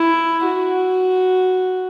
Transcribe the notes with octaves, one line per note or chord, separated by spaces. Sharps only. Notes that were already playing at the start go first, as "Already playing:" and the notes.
Already playing: E4
F#4